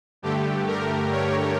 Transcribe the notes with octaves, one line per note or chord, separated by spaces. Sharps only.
G2 D3 A3 G4
A#4
C#5